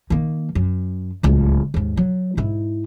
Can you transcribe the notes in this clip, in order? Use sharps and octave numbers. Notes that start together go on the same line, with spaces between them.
D#3 A#3
F#2
D1 C#2
D#2 G#2
F#3
G#2 E4